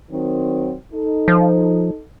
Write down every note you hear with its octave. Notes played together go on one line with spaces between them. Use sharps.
D#3 F#3 C4
D#4 A4
F3